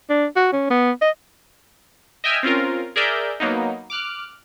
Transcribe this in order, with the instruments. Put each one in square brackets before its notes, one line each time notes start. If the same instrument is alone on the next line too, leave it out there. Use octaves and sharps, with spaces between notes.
[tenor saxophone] D4
F#4
C#4
B3
D#5
[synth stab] D#5 E5 G5 G#5 E6 F6
C4 C#4 F4 A#4
G#4 A#4 D5 E5 G6
F#3 A#3 B3 D#4
D6 F6 F#6